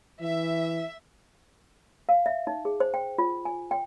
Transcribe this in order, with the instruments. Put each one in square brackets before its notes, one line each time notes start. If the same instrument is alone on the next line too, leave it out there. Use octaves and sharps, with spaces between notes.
[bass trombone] E3 [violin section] E5
[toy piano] F5
E5
D#4
G#4
C5
G5
F4
G#5
G5